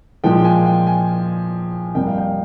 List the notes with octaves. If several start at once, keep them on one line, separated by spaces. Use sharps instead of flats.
A#2 F3 G#3 G5
G#5
G5
G#5
F2 C3 G3 A#3 G5
F5
G5